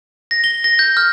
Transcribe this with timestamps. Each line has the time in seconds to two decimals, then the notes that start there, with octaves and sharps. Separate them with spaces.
0.31 A#6
0.44 G7
0.64 A#6
0.79 G6
0.97 F6